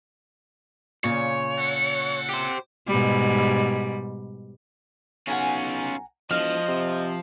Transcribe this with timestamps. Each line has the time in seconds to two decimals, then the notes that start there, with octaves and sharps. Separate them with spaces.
1.04 A#2 C#3 C#5
1.58 C4 A4 F#5
2.29 G4 C5
2.87 G#2 B2 G3
5.28 B1 C#4 F4 F#5 G#5 A#5
6.31 E1 F3 D#5 F6
6.68 C3